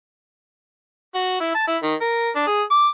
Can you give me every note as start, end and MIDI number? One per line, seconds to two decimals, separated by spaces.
1.15 1.39 66
1.41 1.51 64
1.55 1.66 81
1.68 1.77 64
1.83 1.94 51
2.02 2.30 70
2.36 2.47 62
2.47 2.62 68
2.71 2.87 86